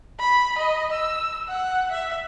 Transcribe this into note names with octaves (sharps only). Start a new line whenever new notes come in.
B5
D#5
E6
F#5
E5